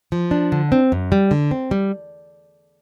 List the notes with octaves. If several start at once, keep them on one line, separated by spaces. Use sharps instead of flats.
F3
D4
D3
C4
F#2
G3
D3
C4
G3